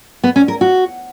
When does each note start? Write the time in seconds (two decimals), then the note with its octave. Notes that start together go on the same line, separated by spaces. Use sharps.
0.24 B3
0.36 C#4
0.48 A#4
0.61 F#4